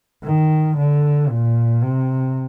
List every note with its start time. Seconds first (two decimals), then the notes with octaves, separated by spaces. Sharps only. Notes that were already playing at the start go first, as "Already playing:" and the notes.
0.24 D#3
0.77 D3
1.29 A#2
1.82 C3